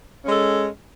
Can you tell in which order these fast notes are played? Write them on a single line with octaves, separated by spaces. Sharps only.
C#4 G#3 A4